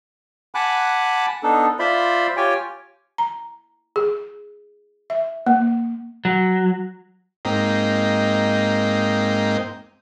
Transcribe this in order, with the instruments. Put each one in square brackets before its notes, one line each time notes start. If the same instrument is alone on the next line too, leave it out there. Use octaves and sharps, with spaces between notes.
[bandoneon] F#5 G#5 A5 B5 D6 F#6
B3 D4 D#4 A4
F4 C5 D5 E5 B5 C6
F4 G4 C#5 G5 G#5
[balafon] A#5
G#4
E5
A#3
[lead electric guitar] F#3
[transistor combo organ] G#2 A#3 C4 D#4 G5